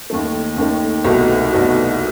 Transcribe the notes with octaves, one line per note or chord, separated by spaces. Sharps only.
D#2 D#3 A3
D#2 D#3 A3
C2 B2 A3 D#4 F#4
C2 B2 A3 D#4 F#4